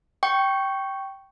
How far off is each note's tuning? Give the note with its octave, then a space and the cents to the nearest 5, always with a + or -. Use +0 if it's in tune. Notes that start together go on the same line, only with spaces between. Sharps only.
G5 -10 C#6 +0